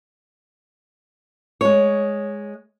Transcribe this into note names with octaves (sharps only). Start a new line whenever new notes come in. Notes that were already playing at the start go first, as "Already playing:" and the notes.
G#3 C#5